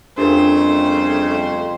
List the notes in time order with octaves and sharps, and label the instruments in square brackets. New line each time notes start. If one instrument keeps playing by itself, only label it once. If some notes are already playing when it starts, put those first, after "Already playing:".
[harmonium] F2 [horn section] C#3 G3 A3 [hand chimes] D4 G4 A#4 [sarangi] C5